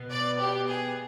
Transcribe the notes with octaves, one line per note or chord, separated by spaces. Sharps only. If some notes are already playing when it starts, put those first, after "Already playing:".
Already playing: B2 B3
D5
G4
G#4